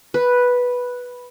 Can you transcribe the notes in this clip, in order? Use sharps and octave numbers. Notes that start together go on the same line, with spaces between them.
B4